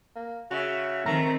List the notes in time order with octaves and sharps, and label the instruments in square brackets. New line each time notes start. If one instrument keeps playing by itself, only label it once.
[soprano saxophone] A#3
[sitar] C#3 [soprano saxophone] F#4 [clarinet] E5
[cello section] D#3 C4 [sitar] A3 [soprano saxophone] A#5